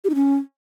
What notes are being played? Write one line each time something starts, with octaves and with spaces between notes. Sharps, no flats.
G4
D#4
C#4